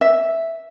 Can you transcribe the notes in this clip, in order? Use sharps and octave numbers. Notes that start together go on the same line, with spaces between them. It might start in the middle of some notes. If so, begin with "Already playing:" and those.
E5